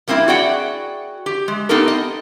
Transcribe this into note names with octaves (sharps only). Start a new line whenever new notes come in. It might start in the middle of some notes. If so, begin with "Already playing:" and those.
G3 A#3 C4 C#4 E4
F#4 G#4 D5 F#5 G5
G4
G#3
B3 C4 D#4 G4 A4 A#4
D#5